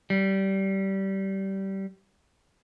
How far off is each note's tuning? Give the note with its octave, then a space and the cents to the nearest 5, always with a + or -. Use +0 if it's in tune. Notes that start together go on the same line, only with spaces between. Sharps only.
G3 -20